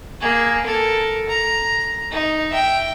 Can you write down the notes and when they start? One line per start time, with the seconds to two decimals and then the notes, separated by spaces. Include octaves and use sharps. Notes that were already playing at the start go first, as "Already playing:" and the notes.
0.20 A#3 G#4
0.65 A4 A#4
1.29 A#5
2.11 D#4
2.50 E5 G5